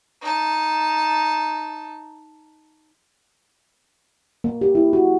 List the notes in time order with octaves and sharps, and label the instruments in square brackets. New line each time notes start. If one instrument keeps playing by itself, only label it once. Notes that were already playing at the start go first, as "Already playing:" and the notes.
[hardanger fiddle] D#4 A5
[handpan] A#3
G4
E4
F#4